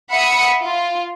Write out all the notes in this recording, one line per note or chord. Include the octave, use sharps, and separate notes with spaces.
E5 F#5 B5 D#6 C#7
F4